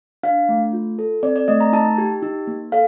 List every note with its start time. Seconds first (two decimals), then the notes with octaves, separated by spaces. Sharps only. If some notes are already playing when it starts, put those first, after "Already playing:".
0.23 D4 F5
0.49 A3
0.73 F4
0.99 A4
1.23 C4 D5
1.36 D5
1.48 A3 D#5
1.61 A#5
1.73 D#4 A5
1.98 G4
2.23 D#4
2.47 A#3
2.72 A4 F5